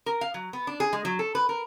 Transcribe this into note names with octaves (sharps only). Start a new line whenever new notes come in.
A#4
F5
F#3
B3
D4
G#4
G#3
F#3
A4
B4
A#4